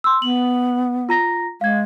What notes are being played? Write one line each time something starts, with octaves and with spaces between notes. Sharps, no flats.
C6 E6
B3 F#7
F4 A#5 A#6
G#3 F5 G#6